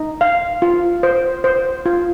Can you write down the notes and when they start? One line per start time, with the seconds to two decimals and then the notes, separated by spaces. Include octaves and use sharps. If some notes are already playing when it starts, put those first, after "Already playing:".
Already playing: D#4
0.21 F5
0.62 F4
1.03 C5
1.44 C5
1.86 F4